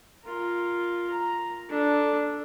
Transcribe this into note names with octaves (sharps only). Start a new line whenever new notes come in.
F4 A#4
A#5
D4 A4